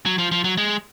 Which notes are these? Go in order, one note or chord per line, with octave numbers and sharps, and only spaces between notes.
F#3
F3
F3
F#3
G#3